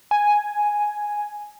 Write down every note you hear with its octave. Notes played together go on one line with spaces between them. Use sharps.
G#5